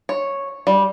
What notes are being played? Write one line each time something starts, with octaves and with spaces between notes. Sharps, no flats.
C#5
G3